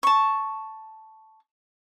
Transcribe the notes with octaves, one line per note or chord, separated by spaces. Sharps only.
A5 C#6